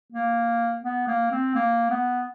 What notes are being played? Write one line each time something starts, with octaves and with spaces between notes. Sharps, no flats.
A#3
B3
A#3
C4
A#3
B3